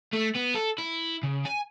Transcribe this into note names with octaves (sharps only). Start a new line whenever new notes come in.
A3
B3
A4
E4
C#3
G#5